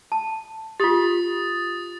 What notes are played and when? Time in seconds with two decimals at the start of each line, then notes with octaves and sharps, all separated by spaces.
0.12 A5
0.80 F4 G4 D#6 A6